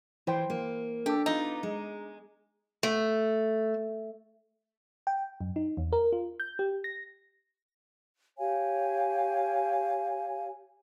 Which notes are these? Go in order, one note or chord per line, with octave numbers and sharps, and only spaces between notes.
E3 E4 C5 G5
A#3
D4 G4 A4 D6
B3 D#4 F4
G#3
A3
G5
F#2
D#4
E2
A#4
F4
G6
G4
A#6
G4 C#5 F5 G#5